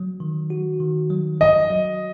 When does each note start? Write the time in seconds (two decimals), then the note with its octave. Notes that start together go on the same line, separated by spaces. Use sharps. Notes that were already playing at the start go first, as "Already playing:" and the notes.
Already playing: F#3
0.20 D#3
0.50 F#4
0.80 D#3
1.10 F#3
1.41 F#3 D#5
1.70 F#3